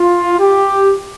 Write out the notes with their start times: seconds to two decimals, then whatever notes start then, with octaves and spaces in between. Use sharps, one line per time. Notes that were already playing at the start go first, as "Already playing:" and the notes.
Already playing: F4
0.40 G4